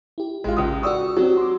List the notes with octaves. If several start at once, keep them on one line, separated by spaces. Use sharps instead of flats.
E4 G4
A1 G#3 F4 G4
C#2 D#6
F#4 D5 C#6 D#6 E6
F#3 C4 F#4 G4
C6 D6